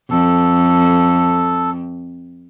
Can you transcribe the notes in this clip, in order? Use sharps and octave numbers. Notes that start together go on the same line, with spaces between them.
F2 A4